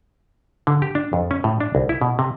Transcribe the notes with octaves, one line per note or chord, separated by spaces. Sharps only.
D3
G4
D4
F2
C#4
A2
D4
C2
E4
B2
C3